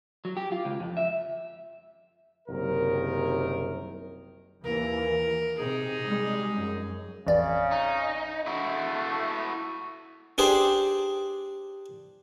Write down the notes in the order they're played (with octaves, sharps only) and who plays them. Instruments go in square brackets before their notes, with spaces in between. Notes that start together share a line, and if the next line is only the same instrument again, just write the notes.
[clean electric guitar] F#3
G4
F4
C#2
F2
E5
[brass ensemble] F#1 C2 F#2 D#3 A#4
[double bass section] D#2 E3 A#3 [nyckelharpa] A#4
[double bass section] C3 [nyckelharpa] D#4 G#4
[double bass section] G3 G#3
F#2
[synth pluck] A1 F2 D5 [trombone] C#3
[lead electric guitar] D#4
[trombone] A3 [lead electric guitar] E4 F#4
[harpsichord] D4 G4 G#4 C5